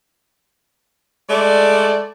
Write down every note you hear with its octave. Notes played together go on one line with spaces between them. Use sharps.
G#3 A3 D5